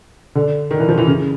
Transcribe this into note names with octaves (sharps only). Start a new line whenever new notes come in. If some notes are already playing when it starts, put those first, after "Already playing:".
D3
D#3
E3
F3
E3
C#3